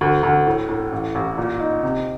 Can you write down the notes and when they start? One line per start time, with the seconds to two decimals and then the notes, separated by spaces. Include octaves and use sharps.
0.01 D2
0.23 D2
0.46 A2
0.69 A2
0.92 A1
1.15 A1
1.38 A#2
1.60 D#4
1.83 C3